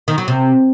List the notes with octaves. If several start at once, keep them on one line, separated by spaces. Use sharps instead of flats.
D#3
F#3
C3